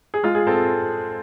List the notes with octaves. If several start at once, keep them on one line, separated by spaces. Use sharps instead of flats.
G#4
G#3 F4
G#4
C4 A4